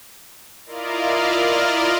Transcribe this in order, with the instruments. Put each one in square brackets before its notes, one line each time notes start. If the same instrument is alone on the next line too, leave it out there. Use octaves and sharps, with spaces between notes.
[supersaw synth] E4 F4 A#4 D5 D#5 F5